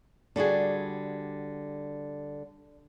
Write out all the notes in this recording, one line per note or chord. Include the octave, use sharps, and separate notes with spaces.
D3 G3 F#4 G#4